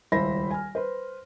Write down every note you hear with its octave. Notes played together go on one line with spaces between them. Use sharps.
D#1 C#2 E4 C5 B5 A#6
G#5 F6
B4 C5